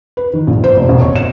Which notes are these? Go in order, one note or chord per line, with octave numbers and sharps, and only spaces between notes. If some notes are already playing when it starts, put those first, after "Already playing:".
B4
D#3
A#1
C5
F1
E1
C#5
E7